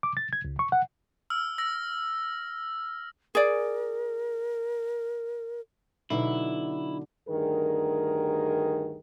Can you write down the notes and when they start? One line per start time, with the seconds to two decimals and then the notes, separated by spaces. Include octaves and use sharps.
0.03 D6
0.17 A6
0.33 G#6
0.45 C#2
0.59 C#6
0.72 F#5
1.30 E6 F6
1.58 E6 A#6
3.35 G#4 A#4 D5
6.10 B2 D3 F#3 D#4 E4
7.28 D2 G2 D#3 G#4 A#4